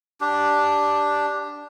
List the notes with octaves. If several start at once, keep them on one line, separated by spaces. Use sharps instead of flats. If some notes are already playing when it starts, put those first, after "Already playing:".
D4 G4